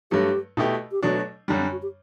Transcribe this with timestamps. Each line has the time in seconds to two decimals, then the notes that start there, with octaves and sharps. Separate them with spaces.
0.11 G2 F#3 A3 G4
0.57 B2 A3 E4 G4
0.92 G4
1.03 B2 F#3 A3 D4 F#4
1.48 F#2 D3 G3 D4
1.59 C4
1.72 F#4
1.82 G4